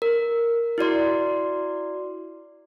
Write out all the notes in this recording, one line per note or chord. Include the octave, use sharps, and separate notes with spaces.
A#4
E4 F#4 D5 C6